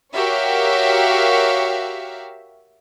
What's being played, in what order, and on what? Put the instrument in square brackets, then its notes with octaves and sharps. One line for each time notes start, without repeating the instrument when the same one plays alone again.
[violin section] F#4 G4 A#4 C#5 E5 F5